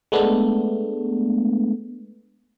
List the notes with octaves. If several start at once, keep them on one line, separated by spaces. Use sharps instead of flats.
G#3 A3 B3 D4